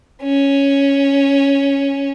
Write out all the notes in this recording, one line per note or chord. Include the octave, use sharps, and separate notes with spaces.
C#4